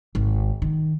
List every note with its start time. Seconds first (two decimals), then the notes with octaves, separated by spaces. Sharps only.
0.15 G#1
0.62 D#3